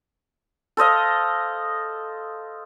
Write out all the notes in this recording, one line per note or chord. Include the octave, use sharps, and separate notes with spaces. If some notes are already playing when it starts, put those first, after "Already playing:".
A4 C5 D#5 F5